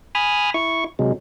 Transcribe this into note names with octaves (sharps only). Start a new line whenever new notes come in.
G#5 B5 D#6 F6
E4 C#6
C3 F#3 G#3